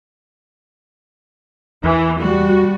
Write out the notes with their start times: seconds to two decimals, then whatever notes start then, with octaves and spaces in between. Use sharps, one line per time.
1.84 E2 E3
2.21 G3 F#4